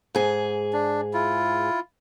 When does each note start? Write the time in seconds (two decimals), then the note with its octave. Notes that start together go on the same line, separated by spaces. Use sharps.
0.15 G#2 G#4
0.73 D4
1.13 E4 F4